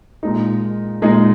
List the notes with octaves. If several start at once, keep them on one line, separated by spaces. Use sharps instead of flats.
A#2 G#3 D#4
A#2 G#3 D#4